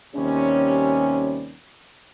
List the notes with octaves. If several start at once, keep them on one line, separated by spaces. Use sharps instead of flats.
D#2 C3 G3 C#4